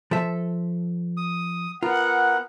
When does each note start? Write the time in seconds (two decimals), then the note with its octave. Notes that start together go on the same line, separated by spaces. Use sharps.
0.11 F3 A4 E5
1.17 D#6
1.83 B3 F4 A#4 F#5